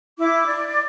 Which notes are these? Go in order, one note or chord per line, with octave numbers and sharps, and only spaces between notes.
E4 D6
D5